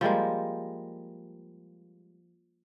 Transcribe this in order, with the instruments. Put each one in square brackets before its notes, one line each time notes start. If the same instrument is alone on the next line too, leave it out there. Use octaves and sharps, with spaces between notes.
[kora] F3 G3 G#3 A#3